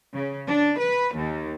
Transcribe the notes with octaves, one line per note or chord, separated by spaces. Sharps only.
C#3
D4
B4
D#2